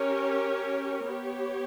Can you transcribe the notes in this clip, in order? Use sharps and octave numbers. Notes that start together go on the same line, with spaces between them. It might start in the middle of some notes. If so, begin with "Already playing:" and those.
Already playing: C#4 G4 A#4 C#5
B3 G4 C#5